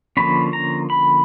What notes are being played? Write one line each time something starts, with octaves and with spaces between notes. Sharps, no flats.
D3 F3 A#3 C#4 B5
A#5
B5